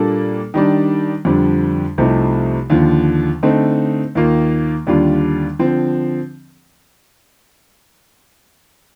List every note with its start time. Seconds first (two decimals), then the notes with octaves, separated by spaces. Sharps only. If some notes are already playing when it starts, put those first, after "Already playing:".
Already playing: A#2 G3 A#3 D4 A4
0.54 D#3 G3 D4
1.25 F2 D3 G3 D4
1.98 C2 C3 F3 A3 D#4
2.70 D#2 D3 F3
3.43 D3 A3 C4 D#4
4.15 D#2 D#3 A#3 F4
4.87 D#2 D3 G3 D4 F4
5.59 D3 F3 C4